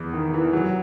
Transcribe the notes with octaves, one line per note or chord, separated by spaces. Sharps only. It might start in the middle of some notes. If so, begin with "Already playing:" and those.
Already playing: E2
D#3
E3
F#3